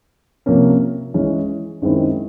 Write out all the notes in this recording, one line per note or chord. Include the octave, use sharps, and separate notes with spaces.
C3 F3 A#3 C#4
E3 G#3 C#4
F#2 D#3 G#3 C4 E4